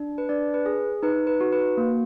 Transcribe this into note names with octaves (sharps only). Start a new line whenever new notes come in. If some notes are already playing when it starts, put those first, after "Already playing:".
Already playing: D4
B4
D4 D5
B4
G#4
D#4 B4
B4
F#4
B4
A#3